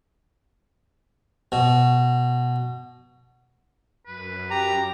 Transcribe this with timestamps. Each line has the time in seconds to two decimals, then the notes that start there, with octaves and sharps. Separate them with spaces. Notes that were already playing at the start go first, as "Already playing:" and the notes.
1.52 B2
4.06 F#2 B4
4.51 G4 A#5